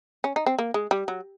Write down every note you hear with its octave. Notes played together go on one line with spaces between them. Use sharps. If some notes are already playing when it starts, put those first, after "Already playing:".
C#4
D#4
C4
A#3
G#3
G3
F#3